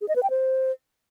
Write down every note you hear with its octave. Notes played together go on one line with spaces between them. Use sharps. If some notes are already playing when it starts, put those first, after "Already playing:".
G#4
D#5
B4
G5
C5